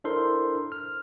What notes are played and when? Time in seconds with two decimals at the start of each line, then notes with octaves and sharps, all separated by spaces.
0.04 D4 E4 A4 A#4 C5 C6
0.72 F6